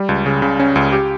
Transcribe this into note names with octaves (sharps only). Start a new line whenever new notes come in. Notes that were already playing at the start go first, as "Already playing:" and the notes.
Already playing: G3
C#2
C#3
C#3
C#4
C#2
G4